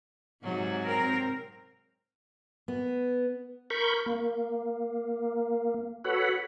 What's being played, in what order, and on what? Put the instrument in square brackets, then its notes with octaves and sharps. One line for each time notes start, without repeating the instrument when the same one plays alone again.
[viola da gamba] G#2 C3 F#3
[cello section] C4 A#4
[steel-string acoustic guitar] B3
[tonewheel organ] A#4 B5 C#6 G6
A#3
F#4 A4 B4 C#5 F#5 B5